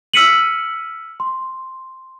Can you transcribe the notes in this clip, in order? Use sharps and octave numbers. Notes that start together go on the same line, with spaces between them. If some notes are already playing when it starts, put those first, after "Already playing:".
E6 F6 B6 C#7 D#7 F#7
C6